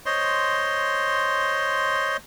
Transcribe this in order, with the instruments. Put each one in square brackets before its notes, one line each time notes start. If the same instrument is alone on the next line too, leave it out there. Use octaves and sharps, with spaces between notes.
[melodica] C5 C#5 D#5 C6